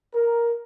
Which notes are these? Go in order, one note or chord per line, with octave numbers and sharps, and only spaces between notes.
A#4